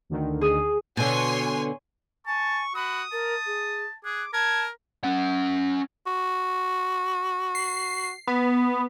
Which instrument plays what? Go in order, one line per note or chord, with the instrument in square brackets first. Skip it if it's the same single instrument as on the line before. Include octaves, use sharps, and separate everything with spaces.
[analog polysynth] D2 D3 D#3
[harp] G#4 D#6
[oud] B2 D3 [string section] C#5 G#5 C6
[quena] G#5 [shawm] A5 [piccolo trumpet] C#6
[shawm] F#4 [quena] B5 [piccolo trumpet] D#6
[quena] A#4 [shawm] A5
[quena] G#4
[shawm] G#4 [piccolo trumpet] D6 [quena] F#6
[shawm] A#4 [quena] A5 [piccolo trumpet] G#6
[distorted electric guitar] C#4 F#5
[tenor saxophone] F#4
[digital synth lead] C7
B3